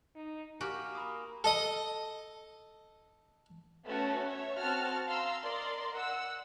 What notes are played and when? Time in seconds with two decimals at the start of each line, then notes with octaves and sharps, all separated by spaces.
0.16 D#4
0.61 A#3 F#4 G4 G#5 F6
0.95 A#5 B5 D#6
1.44 A4 D#5 D#6
3.88 A3 B3 C#4 F#4 C#5 A5
4.27 C#5 E5
4.59 C4 F#4 A5 F6
5.07 F5 A#5 C6 E6
5.41 A#4 D5 D#5 C6
5.93 F#5 E6